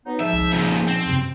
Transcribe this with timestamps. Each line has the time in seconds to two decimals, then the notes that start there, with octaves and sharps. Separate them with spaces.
0.06 F#3 B3 D#4
0.21 G#2 F3 E5
0.33 C2
0.54 A#2 C#3 C#4
0.88 C4
1.06 F#2 C3